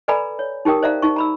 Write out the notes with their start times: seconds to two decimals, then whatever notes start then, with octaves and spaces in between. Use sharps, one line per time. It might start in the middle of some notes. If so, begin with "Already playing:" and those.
0.08 A4 B4 D5 G#5 A#5 B5
0.39 C#5
0.65 D#4 G4 A#4 G5 D#6
0.83 C5 D5 E5 F5 A#5
1.02 D#4 C#6
1.16 A#5 B5 E6